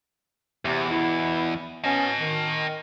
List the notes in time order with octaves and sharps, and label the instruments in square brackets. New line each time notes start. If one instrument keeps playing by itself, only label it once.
[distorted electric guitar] E2 [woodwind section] C3
[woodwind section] B2 E4
[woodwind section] F#3 B3 C#4 [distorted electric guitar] D#5 A5
[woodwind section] D#3